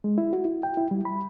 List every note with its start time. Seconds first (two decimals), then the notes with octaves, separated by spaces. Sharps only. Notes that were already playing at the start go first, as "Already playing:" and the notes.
0.04 G#3
0.18 E4
0.33 F#4
0.45 E4
0.63 G5
0.77 E4
0.91 G3
1.05 B5